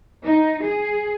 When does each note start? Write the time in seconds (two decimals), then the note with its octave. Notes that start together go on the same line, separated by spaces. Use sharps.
0.25 D#4
0.65 G#4